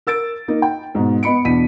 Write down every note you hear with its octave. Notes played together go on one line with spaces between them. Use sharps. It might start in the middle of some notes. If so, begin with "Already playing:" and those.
A#4 E6 A6 D7
A#3 D#4 A#4
G5
G#2 B2
B3 D#5 B5 C#7 D7
E2 B2 D4 B6 D#7